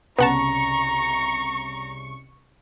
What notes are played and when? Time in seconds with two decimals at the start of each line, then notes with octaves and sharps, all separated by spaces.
0.18 C2 C#3 B3 F#5 A5 A#5 C#6